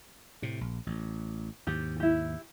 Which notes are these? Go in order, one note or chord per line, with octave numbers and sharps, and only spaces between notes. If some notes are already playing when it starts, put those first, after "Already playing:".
A2 C3
A#1
A1
D#2 G#2 G4
E4 G4